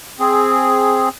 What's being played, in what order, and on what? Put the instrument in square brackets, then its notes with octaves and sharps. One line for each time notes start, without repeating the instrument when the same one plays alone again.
[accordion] C4 G#4